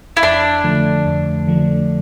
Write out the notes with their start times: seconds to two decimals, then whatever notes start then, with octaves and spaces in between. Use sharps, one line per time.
0.17 E4
0.23 F2 D4
0.64 D3 F3 A3
1.05 F2
1.47 D3 F3 A3